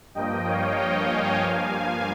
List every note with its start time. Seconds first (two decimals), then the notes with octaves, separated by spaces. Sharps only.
0.14 G2 F3 A#3 D#5 G5
0.46 C#5 F5
0.78 D#5 G5
1.09 F5 G#5
1.41 G2 F3 A#3